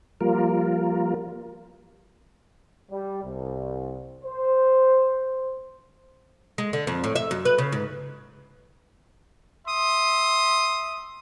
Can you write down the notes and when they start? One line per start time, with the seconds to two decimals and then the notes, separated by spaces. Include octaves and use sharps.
0.21 F3 G3 A#3 F4 A#4
2.91 G3
3.23 C2
4.25 C5
6.58 G#3
6.73 D3
6.87 F2
7.04 A2
7.16 E5
7.31 F#2
7.45 B4
7.58 C#3
7.72 G#2
9.67 E5 C6 D#6